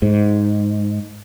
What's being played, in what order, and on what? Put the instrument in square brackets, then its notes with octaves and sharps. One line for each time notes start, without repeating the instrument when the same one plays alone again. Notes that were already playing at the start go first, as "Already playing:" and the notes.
[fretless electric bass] G#2